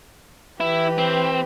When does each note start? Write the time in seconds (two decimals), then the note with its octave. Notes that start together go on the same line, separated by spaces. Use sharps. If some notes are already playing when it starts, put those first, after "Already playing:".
0.60 E3 E4 G4 B4
0.98 C4